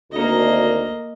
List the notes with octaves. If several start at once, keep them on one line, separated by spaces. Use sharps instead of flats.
G#1 D2 A#3 D#5